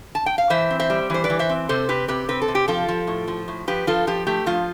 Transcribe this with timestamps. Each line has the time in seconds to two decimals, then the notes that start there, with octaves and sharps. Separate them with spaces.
0.15 A5
0.26 G5
0.38 F5
0.50 E3 C5 E5
0.70 C4
0.80 C5 E5
0.90 G3
1.10 E3 C5
1.24 B4 D5
1.30 E3
1.39 C5 E5
1.49 C4
1.69 C3 A4 C5
1.89 C4 G4 B4
2.08 C3 G4 B4
2.29 C4 B4
2.42 A4
2.48 C3
2.55 G4
2.68 F3 F4 A4
2.88 F3
3.07 A2
3.28 F3
3.48 A2
3.67 F3 G4 B4
3.87 F3 F4 A4
4.07 F3 G4
4.27 A3 G4
4.46 F3 F4